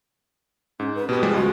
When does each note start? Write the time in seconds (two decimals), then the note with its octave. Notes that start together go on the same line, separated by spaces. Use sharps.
0.80 G#2 C#4
0.95 B4
1.09 B2 B3 G4
1.23 F3 G3 G#3
1.34 C#2 G#3 F#4